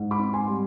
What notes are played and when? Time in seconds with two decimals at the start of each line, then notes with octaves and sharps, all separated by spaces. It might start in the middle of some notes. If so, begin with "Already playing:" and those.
Already playing: G#2
0.11 B5 D6
0.19 C4
0.33 G#5 C6
0.48 G3